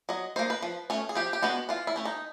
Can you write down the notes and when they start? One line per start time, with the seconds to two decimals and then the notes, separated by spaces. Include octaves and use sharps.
0.09 F#3 D#5
0.36 A#3 D#4 C5
0.50 B4
0.62 F3
0.90 A3 C#4
1.09 G#4
1.15 F3 G4
1.33 G4
1.42 G#3 B3 D4 F#4
1.69 E3 F4
1.87 E4
1.96 A3 C#4
2.05 D#4